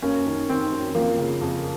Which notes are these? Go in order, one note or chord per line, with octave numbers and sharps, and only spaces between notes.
F#2 A#3 C#4
D#3
D#3 C4
F#2
F3 A#3
C#3
F2